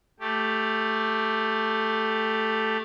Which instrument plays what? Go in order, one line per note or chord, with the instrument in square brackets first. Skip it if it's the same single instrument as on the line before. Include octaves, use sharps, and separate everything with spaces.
[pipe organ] A3 G4